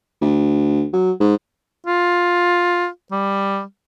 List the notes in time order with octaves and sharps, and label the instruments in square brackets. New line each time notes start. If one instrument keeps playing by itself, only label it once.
[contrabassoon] D2
F#3
G#2
[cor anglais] F4
G3